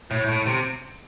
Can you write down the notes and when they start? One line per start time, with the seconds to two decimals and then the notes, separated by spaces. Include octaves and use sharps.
0.11 A2
0.28 A2
0.46 C3